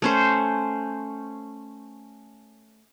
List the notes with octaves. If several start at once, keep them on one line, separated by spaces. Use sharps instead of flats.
A3 C#4 C5